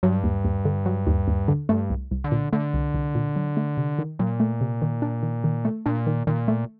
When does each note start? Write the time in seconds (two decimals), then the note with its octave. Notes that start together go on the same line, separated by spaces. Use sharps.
0.03 G2 F#3
0.24 D#2
0.45 D#2
0.65 D3
0.86 F#3
1.07 D#2
1.28 D#2
1.48 D3
1.69 G2 A3
1.90 C2
2.11 C2
2.24 D3
2.32 A#2
2.53 D3 A3
2.74 C2
2.94 C2
3.15 A#2
3.36 F#3
3.57 A3
3.77 C3
3.99 D#3
4.19 A#2 F#3
4.40 A3
4.61 C3
4.82 D#3
5.02 D4
5.23 D#3
5.44 D#3
5.65 A3
5.86 A#2 D4
6.07 D#3
6.27 A#2 D#3
6.48 A3